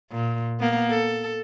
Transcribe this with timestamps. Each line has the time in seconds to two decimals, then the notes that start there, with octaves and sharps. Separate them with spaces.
0.11 A#2
0.59 A#3 B3
0.90 A4